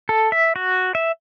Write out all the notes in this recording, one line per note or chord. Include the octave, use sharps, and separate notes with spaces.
A4
E5
F#4
E5